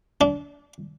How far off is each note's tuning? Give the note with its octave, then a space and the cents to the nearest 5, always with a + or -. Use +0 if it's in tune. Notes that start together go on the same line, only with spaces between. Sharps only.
D4 -30